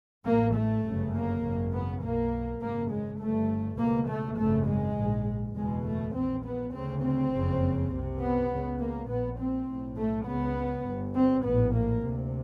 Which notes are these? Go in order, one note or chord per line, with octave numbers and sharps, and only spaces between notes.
A1 A2 A#3
A3
G1 F#2 C#3
A#3
G#1 F#2 C#3
B3
B1 B2 A#3
G#1 F#2 C#3 A#3
G#3
G1 G2 A3
C#2 B2 A#3
A3
G#1 F#2 C#3 A3
G#3
A#1 G#2
F#1 E2 B2 G#3
A3
A#1 A#2 C4
B3
D2 C#3 C4
C4
F#1 F2 C#3
C2 C3
B3
C#2 C#3
A#3
A#1 A#2 B3
C4
B1 A2
A3
C#2 C#3 B3
G1 G2
C4
A#1 A2 B3
A#3
D2 C3